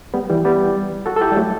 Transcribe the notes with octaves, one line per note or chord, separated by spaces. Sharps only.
G3 B3
E3 G3
G3 B3
F#4 A4
A4
E4 G4
G3
F#3 A3